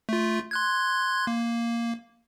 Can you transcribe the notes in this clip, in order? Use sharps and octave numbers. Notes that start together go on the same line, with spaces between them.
A3 F4
C6 F#6 G#6
A#3